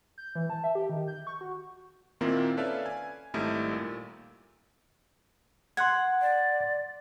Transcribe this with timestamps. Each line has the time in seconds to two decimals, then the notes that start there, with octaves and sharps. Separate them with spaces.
0.18 G6
0.35 E3
0.50 A5
0.64 E5
0.75 G4
0.90 D#3
1.08 G6
1.27 C#6
1.41 F#4
2.21 A#2 D#3 A#3 C4 E4 F4
2.57 C#4 A4 B4 D5 E5 F5
2.86 G#5
3.34 G#1 G3 A3 D#4 E4
3.73 A#2
5.77 F#5 C6 F#6 G#6
6.21 D5